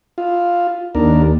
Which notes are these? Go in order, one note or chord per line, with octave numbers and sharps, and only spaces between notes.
F4
D#2 D4 A#4